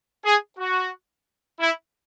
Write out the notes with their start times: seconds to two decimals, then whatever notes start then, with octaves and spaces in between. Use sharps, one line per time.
0.24 G#4
0.58 F#4
1.60 E4